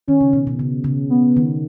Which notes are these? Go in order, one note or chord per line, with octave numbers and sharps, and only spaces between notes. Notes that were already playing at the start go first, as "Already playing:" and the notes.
D#3 C#4
C#3
B2
B2
C#3
C#3
B3
D#3